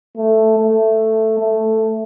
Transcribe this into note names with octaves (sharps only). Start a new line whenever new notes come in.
A3
A3
A3